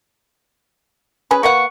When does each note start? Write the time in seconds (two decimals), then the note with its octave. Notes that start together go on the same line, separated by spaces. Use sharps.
1.31 C#4 G#4 B4
1.43 A#3 B4 F#5 C#6